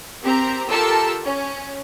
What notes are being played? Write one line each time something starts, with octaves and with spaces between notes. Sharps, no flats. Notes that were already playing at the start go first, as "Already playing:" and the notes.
C4 G4 A#4 A#5
F4 G4 A4 A#4 A5 E6
C#4